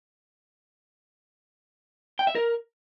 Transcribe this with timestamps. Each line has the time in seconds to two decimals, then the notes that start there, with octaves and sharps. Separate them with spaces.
2.19 G5
2.27 E5
2.35 A#4